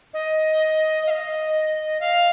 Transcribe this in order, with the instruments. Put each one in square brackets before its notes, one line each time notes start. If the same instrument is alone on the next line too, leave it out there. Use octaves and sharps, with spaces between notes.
[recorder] D#5
F5
D#5
F5